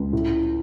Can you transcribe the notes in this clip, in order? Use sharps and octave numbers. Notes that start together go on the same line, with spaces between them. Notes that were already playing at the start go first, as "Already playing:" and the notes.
Already playing: C#2
A2